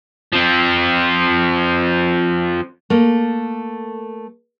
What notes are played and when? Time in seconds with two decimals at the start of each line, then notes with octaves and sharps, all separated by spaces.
0.33 F3 C4
2.90 A3 A#3